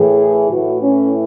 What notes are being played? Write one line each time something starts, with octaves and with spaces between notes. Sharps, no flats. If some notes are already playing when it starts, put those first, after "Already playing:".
Already playing: A2 E3 G#4
A2 E3 F#4
C#4